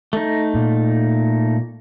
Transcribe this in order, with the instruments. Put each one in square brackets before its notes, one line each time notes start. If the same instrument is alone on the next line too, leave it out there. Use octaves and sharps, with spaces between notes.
[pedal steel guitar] A3 D#4
[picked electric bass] A#2